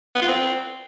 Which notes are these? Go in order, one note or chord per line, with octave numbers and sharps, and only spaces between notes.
B3
F4
C4